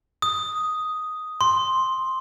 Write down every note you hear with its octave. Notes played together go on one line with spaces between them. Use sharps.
D#6
C6